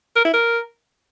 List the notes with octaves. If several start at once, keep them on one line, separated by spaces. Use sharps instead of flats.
A#4
E4
A#4